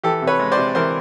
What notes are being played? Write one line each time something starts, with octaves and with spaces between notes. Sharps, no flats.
E3 G4 A4
C3
B4 C#5
G#3
C5 D5
C3
E3 A#4 C5